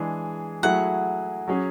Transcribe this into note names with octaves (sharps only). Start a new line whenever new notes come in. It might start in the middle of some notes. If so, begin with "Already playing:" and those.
Already playing: E3 G#3 D4 G#4
F#3 A3 E4 G#4 F#5
F#3 C#4 G#4